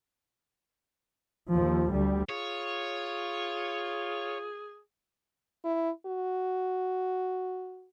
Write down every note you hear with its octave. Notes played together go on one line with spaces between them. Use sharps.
D#2 F3
D2 G3
F4 G#4 C#5
E4
F#4